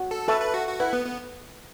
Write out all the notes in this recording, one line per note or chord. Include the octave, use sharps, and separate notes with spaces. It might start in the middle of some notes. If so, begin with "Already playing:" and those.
Already playing: F#4
A4
A4 B4 E5 A5 C#6
B4
F#4
F#4
E4 B4 F#5 B5
B3
B3